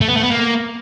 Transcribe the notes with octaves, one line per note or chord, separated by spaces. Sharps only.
A3
B3
A3
B3
A#3